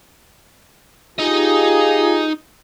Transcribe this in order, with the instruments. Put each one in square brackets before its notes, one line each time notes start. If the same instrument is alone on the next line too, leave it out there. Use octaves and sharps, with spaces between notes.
[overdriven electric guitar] D#4 D#5 [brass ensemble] F4 G4 G#4